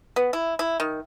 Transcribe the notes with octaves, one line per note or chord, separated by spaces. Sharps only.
B3
E4
E4
D#3